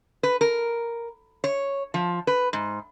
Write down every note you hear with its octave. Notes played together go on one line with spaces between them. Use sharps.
B4
A#4
C#5
F3
B4
G#2